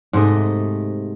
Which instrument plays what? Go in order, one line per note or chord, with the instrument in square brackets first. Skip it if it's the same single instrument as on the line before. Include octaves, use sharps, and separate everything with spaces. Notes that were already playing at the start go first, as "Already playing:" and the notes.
[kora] G#2 C3 A3 D#5